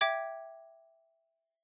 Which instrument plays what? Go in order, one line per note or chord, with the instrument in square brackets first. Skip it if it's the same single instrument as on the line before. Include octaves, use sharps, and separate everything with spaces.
[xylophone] E5 G5 D6 G#6